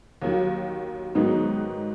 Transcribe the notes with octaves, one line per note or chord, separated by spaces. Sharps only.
D#2 D#3 F#3
G#2 D#3 F#3 B3 D#4